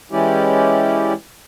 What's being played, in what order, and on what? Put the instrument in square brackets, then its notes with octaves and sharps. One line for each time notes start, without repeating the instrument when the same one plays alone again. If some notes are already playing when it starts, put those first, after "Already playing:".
[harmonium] E3 G#3 C#4 E4 G4 D5